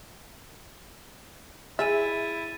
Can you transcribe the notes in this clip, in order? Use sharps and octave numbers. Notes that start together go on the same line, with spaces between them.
E4 G#4 E5 G#5 A6 D#7